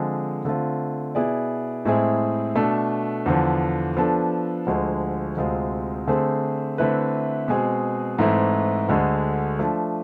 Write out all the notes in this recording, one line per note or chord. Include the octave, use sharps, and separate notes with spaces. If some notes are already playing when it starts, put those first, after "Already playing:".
Already playing: D3 F3 G#3 C4 G#4
D3 A3 C4 F4
B2 B3 E4 G#4 D5
A2 G#3 C4 E4 G#4
B2 A3 D4 A4
E2 D3 F3
F3 B3 D4 A4
D2 D3 F3 G#3
D2 C3 G#3 C4 F4
D3 A3 C4 G#4 C5
D3 A3 C4 E4 B4
B2 G#3 C4 G#4
G#2 E3 A3 C4 E4
D2 D3 G#3
F3 A3 D4